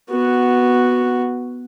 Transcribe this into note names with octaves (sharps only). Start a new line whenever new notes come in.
B3 F#4